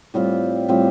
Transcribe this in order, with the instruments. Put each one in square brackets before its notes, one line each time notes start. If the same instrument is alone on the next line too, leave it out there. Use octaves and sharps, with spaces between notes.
[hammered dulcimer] A2 G3 C4 F4
A2 G3 C4 F4